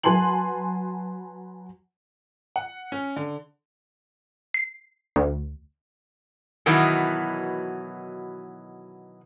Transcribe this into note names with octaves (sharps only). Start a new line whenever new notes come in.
F#3 B4 G#5 A5 C6 F#7
F#5
C#4
D3
C7
D2
B2 D#3 E3 F#3 B3